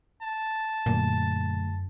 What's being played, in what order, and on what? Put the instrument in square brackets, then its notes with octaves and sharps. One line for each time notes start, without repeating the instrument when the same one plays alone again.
[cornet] A5
[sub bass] F#2 [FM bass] A#2 [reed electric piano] D3 F#3 A3